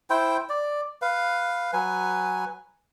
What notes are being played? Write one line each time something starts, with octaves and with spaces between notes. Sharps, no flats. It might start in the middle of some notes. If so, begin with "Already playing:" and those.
E4 C5 G5
D5
B4 F5
F#3 B4 G#5